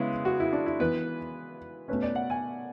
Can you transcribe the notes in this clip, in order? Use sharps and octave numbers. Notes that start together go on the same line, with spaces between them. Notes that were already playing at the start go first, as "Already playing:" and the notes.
Already playing: C#3 G#3 B3 E4
F#4
E4
D4
E4
E3 B3 B4
B2 A3 C#4 B4
D5
F#5
G#5